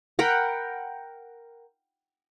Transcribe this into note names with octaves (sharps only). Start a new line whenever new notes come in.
A#4 F#5 G5 B5